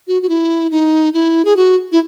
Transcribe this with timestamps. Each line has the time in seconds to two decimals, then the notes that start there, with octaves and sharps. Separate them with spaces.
0.08 F#4
0.22 F#4
0.29 E4
0.71 D#4
1.14 E4
1.45 G#4
1.57 F#4
1.92 E4